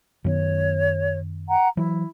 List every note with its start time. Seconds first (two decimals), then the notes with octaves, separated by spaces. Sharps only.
0.24 F#2 D#3 B3 C#5
1.48 F#5 G5 A#5
1.77 E3 F#3 E4